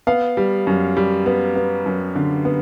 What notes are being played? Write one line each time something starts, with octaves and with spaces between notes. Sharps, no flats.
B3 F5
G3
F#2
G3
B3
B3
F#2
D3
B3